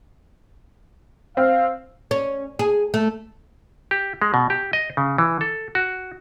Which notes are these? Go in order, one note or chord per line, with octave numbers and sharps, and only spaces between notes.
C4 F5
C#4
G#4
A3
G4
G#3
B2
G4
D#5
C#3
E3
A4
F#4